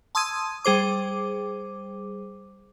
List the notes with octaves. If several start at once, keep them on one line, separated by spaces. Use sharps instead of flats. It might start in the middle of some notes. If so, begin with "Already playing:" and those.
A5 C6 D#6 E6 G#6 D#7
G3 G#4 C5 D6